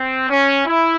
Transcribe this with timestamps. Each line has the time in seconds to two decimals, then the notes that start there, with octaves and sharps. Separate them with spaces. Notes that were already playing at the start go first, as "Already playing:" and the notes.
Already playing: C4
0.29 C#4
0.66 E4